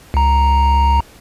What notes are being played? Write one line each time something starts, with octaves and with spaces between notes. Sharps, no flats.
C#2 A#5